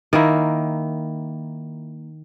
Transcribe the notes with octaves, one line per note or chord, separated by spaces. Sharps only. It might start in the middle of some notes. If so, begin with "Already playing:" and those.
D#3 A#3 E4